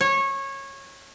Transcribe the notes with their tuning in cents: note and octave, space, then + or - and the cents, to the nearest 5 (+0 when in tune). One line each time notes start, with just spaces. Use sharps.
C#5 -20